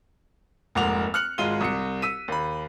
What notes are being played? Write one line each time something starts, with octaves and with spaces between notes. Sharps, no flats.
F1 G#2 A#3 F#5 D6 F7
F6 F#6 C#7 F#7
G#1 G#3 F4 D#7 G7
C2 C#7
E6 B6 D#7
D#2 B5